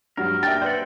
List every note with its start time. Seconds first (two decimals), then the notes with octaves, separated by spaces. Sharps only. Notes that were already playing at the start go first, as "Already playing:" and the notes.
0.17 G2 F#3 A#4
0.43 A#3 D4 E5 G5 A6
0.62 B4 C5 D5 F#5